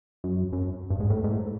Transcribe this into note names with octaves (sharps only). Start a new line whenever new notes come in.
F#2
F#2
G2
G#2
A2
G#2
A2